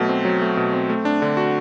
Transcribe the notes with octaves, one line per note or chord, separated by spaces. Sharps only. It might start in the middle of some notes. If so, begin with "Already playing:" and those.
Already playing: B2 F#3 A3
C4
F#3
A3
B2
C4
A3
D4
D3
F#4